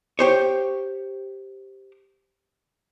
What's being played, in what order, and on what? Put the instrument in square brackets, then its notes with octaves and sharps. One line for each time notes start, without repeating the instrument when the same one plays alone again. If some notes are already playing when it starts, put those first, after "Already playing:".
[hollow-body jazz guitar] G4 C5 C#5